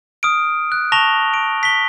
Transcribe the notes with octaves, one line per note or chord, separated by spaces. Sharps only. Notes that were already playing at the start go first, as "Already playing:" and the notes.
D#6 F6 D7
F#6
A5 C#6 A#6 F7 G7
D7
B6 G7